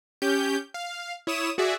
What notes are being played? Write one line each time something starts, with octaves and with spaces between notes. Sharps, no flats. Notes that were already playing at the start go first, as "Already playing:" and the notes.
C#4 G4 G6
F5
E4 C#5 D#6 E7
F#4 G#4 D5 E5